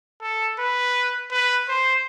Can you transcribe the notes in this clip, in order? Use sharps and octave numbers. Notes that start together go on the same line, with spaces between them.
A4
B4
B4
C5